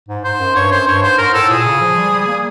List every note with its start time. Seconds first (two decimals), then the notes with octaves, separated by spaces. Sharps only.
0.09 G#2
0.24 G#2 C5
0.40 F#2
0.55 G2 C#5
0.72 F#2 C5
0.87 G2 C#5
1.03 G#2 C5
1.18 G#2 A#4
1.34 A2 A4
1.50 A#2 G#4
1.66 C#3
1.81 F3
1.97 G3
2.13 G3
2.28 A#3